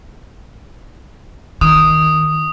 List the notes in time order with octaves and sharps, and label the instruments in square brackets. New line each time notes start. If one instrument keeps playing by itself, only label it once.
[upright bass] D#3 [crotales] D#6